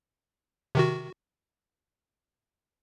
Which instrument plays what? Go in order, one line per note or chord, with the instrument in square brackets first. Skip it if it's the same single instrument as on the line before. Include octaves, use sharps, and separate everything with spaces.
[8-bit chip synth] C3 D#3 F#4